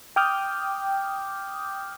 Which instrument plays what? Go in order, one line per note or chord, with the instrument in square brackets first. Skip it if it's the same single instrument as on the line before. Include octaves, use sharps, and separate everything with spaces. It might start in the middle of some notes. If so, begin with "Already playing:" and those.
[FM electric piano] G5 D6 D#6 F6 G6